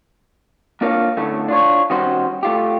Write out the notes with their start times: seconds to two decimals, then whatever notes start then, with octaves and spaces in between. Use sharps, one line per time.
0.81 A#3 D4 F4 A#4 C#5 F5
1.17 A2 D3 A3 C#4
1.48 D4 F4 C#5
1.90 D#3 G3 B3 C#4 F#4 C5
2.43 A3 F4 G4